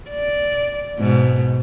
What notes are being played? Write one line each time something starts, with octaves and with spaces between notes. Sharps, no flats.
D5
G#2 B2